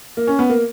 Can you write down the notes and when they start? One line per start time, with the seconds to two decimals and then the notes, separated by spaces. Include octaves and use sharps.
0.17 A#3
0.27 C#4
0.39 B3
0.49 A#3